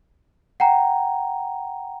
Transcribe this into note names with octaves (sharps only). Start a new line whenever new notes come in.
F#5 G5 A#5